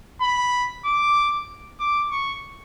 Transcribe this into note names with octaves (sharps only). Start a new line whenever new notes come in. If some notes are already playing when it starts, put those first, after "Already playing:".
B5
D6
D6
C#6